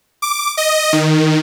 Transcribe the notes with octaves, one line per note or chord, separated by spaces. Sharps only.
D6
D#5
D#3